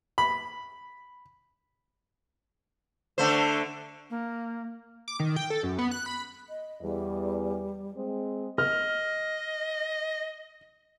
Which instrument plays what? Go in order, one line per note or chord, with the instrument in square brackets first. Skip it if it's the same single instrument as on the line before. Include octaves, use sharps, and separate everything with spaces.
[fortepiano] B5
[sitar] D3 A3 C5
[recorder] A#3
[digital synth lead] D6
D#3
G5
A4
F#2
B3
F#6
B5
[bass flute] D#5
[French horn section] E2 [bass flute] G3
[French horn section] G#3 C4
[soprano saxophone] D#5 [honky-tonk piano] F6